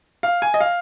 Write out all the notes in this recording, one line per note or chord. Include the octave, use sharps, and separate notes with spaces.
F5
G#5
D#5
F5